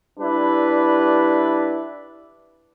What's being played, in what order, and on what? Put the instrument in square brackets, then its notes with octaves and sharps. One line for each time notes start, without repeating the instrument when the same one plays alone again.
[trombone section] G3 D4 E4 B4